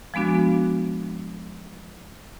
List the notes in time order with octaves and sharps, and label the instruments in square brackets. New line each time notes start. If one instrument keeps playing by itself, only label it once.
[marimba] F3 G#3 B3 D4 F#4